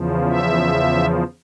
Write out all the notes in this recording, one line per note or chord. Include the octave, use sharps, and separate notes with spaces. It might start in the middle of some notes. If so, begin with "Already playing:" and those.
Already playing: E2 C#3 F3
E5